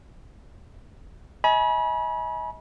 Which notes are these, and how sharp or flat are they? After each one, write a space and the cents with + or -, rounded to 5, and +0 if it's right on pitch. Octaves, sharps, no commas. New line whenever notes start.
D#5 +35 G#5 +30 B5 -35